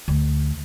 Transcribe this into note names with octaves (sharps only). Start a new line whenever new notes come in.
D2